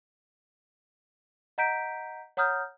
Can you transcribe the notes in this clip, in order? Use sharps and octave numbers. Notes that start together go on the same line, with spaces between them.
D#5 F#5 A#5 G6 B6 D7
C#5 F#5 A#5 D#6 F6 G6